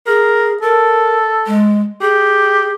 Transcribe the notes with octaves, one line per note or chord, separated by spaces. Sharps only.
G#4 A#4
A4 A#4
G#3
G4 G#4